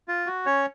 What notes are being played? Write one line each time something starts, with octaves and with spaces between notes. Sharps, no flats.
F4
F#4
C#4 C#5